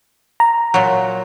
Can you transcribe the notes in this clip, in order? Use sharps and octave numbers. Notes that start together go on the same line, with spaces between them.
A#5
A#2 F#3